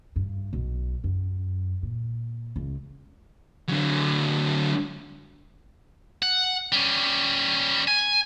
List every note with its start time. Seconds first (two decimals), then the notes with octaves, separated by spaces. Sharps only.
0.16 G2
0.53 B1
1.04 F#2
1.83 A#2
2.56 C#2
3.69 D3 F#3
6.22 F#5
6.72 G3 C#4
7.88 G#5